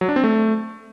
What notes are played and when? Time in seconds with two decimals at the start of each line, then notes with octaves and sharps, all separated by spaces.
0.01 F#3
0.09 D4
0.16 C4
0.24 A3